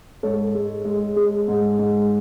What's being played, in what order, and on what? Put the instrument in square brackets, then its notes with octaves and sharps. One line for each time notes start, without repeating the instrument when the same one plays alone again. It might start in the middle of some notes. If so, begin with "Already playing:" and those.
[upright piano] G#2 A4 C#5
G#3
G#3
G#3
G#2
G#2